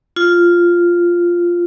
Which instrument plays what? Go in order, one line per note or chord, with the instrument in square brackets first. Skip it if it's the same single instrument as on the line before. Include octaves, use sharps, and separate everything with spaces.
[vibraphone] F4